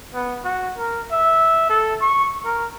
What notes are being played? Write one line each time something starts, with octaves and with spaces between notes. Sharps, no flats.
B3
F#4
A#4
E5
A4
C#6
A#4